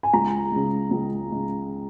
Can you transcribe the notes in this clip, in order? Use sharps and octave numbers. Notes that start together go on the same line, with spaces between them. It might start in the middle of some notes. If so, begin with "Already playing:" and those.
G#5
C#2 A#5
C#3 G#3
C#2
C#3 G#3